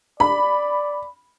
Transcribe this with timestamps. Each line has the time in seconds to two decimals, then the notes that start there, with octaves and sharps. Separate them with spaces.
0.20 D5 B5